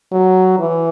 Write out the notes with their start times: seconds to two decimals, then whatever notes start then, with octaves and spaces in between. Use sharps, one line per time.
0.13 F#3
0.59 E3